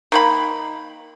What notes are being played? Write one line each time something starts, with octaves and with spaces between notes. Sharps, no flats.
D#3 A#3 B5